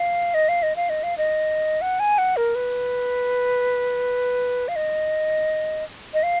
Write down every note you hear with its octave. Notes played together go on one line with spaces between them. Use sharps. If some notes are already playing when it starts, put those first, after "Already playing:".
Already playing: F5
D#5
F5
D#5
F5
D#5
F5
D#5
F#5
G#5
F#5
A#4
B4
F5
D#5
D#5
F5